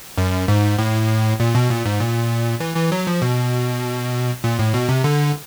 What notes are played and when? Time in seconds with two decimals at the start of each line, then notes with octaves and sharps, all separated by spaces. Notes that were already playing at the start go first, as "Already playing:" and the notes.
0.18 F#2
0.48 G#2
0.79 A2
1.40 A#2
1.55 B2
1.69 A#2
1.85 G#2
2.00 A#2
2.60 E3
2.76 E3
2.92 F#3
3.07 F3
3.22 B2
4.44 A#2
4.59 A2
4.74 B2
4.89 C3
5.04 D3